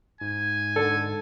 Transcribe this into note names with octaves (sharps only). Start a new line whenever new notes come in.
G#2 G#5
D3 A4